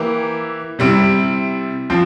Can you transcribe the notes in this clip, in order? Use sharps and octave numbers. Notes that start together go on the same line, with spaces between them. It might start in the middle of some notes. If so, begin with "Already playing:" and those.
Already playing: E3 A#3 E4 G4 A#4
C3 G3 C4 E4
F3 C4